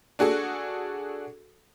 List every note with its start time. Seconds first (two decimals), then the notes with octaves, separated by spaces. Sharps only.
0.19 D4 F#4 G#4 A4